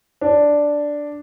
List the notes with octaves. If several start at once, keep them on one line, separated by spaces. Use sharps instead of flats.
D4